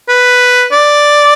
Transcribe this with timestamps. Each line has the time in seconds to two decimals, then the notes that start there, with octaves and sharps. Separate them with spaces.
0.09 B4
0.72 D5